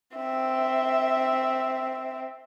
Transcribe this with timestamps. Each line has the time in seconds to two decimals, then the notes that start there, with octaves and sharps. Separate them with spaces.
0.16 C4 E5